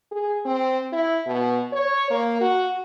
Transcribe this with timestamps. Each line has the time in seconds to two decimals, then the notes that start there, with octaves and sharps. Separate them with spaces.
0.11 G#4
0.45 C4
0.92 E4
1.26 B2
1.73 C#5
2.11 A#3
2.41 F#4